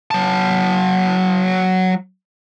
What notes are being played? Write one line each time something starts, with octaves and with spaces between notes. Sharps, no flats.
F#3 A5